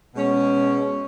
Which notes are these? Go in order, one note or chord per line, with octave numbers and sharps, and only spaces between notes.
B2 G#3 C#4